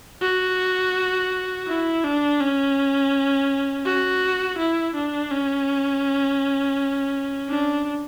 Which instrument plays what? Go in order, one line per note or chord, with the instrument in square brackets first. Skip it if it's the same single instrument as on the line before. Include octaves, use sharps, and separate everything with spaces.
[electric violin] F#4
E4
D4
C#4
F#4
E4
D4
C#4
D4